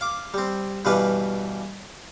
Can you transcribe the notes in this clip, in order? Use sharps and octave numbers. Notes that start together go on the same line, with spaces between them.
F5 D6
G3 C4
G2 B2 E3 G3 B4 F5